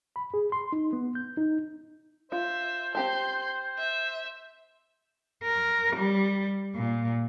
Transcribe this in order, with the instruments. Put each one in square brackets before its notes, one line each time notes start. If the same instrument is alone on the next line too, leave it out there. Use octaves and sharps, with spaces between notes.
[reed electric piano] B5
G#4
C6
D#4
B3
G6
D#4
[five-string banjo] F4 [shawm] C5 [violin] E5
[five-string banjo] C4 G4 A5 [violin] C6 G6
[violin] E5
[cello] A#4
G3
A#2